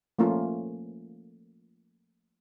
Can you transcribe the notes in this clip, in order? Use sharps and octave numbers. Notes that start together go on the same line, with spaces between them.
F3 A3 A#3 C#4 F4